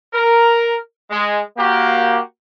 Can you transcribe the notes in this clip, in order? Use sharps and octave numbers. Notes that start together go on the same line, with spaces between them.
A#4
G#3
A#3 F#4 G4